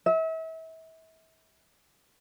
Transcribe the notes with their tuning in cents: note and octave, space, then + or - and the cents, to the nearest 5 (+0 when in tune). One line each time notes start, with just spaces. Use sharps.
E5 -35